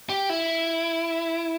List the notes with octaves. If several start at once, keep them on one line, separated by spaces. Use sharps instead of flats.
G4
E4